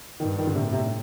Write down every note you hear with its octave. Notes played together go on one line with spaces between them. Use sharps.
G2 D#3
D#3
D3
A2 C3
C3